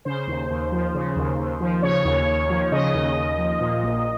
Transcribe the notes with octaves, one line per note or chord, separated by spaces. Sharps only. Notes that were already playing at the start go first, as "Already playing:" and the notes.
C#3 C5
D#2
D#2
F3
C#3
D#2
D#2
F3
C#3 C#5
D#2
D#2
F3
C#3 D#5
D#2
D#2
F3
A#2
A#1